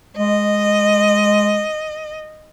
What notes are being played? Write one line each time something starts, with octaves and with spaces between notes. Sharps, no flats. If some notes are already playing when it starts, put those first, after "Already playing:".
G#3 D#5